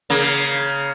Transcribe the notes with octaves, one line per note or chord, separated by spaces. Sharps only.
C#3 A#3